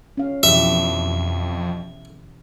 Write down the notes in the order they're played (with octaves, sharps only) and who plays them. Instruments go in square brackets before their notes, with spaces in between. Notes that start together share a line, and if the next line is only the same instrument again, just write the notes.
[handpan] C#4 F5
[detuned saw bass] F2 [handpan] B2 E3 G4 [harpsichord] E5